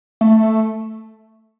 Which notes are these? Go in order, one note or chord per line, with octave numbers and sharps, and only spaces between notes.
A3